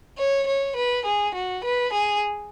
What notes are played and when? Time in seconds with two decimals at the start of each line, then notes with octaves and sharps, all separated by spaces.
0.18 C#5
0.47 C#5
0.76 B4
1.05 G#4
1.35 F#4
1.64 B4
1.93 G#4